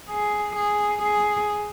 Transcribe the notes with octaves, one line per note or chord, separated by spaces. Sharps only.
G#4
G#4
G#4